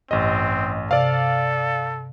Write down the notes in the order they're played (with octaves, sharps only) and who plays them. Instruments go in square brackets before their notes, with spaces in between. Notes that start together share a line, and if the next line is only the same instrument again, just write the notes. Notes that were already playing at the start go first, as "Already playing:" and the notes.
[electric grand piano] A1 D#5 [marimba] G2 [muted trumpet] C4
[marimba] C3 [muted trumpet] A4 [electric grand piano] D5 F5